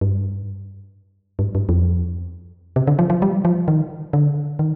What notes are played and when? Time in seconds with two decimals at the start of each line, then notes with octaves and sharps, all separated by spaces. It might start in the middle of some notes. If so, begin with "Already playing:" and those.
0.01 G2
1.39 G2
1.55 G2
1.69 F2
2.76 C3
2.87 D3
2.99 F3
3.10 F3
3.22 G3
3.45 F3
3.68 D#3
4.13 D3
4.59 D#3